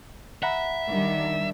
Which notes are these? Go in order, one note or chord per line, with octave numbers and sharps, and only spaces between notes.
E5 F#5 A#5 B5
D#3 G3 D4